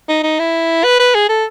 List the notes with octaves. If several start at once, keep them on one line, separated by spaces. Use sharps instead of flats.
D#4
D#4
E4
B4
B4
G#4
A4